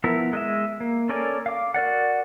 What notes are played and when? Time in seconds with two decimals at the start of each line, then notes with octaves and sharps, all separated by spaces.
0.04 F3 B3 E4 A#4 E5
0.33 G#3 D#5 E5
0.80 A#3
1.09 C#4 A4 A#4 D5 G#5
1.46 F5 D6
1.74 F#4 A#4 D5 F#5